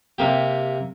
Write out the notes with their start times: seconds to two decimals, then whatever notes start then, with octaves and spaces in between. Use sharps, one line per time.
0.18 C3 A#3 G4